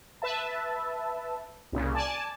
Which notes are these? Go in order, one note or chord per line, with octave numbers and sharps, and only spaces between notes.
B4 E5 A5
C2 A#2 C#3
D5 G#5 A5